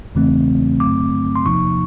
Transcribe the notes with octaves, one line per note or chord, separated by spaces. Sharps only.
E2 C#3 E3 A3 C4
G2 D3 F#3 A3 C4 D6
C6
E2 C3 F3 A#3 D#4 C#6